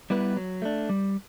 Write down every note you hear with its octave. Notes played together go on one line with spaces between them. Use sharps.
G3 B3 E4 B4
F#3
A3 D4
G3